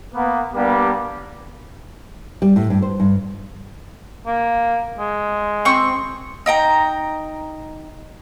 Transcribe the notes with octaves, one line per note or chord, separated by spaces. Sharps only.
A#3 B3
G3 A#3 B3 D4 G4
G3
A2
G2
C5
G2
A#3
G#3
C4 C#6
D#4 G5 A#5